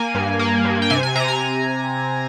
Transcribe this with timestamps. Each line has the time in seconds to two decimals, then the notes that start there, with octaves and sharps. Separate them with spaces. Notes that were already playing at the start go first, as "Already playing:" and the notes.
Already playing: A#3 G#5
0.15 G2
0.39 A#3
0.65 G2
0.82 G5
0.90 C3 G#5
1.03 G#5
1.15 C3 A#5
1.28 G#5